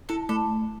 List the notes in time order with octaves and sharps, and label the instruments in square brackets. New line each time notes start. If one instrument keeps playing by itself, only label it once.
[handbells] E4 [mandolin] A4
[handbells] A3 [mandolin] A4